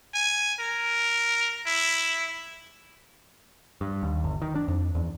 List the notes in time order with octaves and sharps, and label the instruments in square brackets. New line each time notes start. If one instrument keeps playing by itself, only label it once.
[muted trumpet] G#5
A#4
E4
[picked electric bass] G2
D#2
G1
D#3
D4
F2
E2